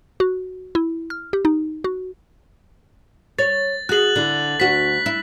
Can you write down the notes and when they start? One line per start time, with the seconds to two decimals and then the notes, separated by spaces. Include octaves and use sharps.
0.20 F#4
0.75 E4
1.10 F6
1.33 G4
1.45 D#4
1.84 F#4
3.39 C#5 A6
3.89 F#4 G#4 F#6 F#7
4.16 D3 E4
4.60 D2 F#4 B6
5.06 E4